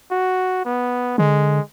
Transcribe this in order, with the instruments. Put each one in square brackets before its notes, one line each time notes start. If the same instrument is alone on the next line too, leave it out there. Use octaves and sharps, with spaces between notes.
[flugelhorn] F#4
B3
[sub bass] D3 [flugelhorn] G#3